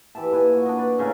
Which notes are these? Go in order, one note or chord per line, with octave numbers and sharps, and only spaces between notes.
E3 G4 E5 A5
A#2 B4 G#5
F#4
D4 D#5
B4 D5
A2 C#3 A#3 C#4